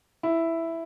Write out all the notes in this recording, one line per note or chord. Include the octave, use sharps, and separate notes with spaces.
E4